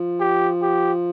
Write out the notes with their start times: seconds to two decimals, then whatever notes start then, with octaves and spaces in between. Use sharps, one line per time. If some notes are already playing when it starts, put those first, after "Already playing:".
Already playing: F3
0.20 G4
0.62 G4